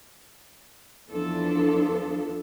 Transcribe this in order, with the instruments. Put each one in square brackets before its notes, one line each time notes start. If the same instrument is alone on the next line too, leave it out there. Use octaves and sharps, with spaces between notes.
[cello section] E2 E3 F3 D4 A4